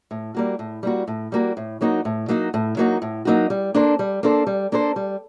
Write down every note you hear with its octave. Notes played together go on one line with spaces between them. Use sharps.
A2
G3 A#3 F#4
A2
G3 A#3 F#4
A2
G3 A#3 F#4
A2
F#3 A#3 D#4 F#4
A2
F#3 A#3 D#4 F#4
A2
F#3 A#3 D#4 F#4
A2
F#3 A#3 D#4 F#4
G3
A#3 D4 A4 C5
G3
A#3 D4 A4 C5
G3
A#3 D4 A4 C5
G3